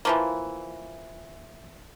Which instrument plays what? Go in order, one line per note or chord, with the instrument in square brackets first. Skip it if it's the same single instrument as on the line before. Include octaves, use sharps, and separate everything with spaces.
[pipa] E3 F3 A#3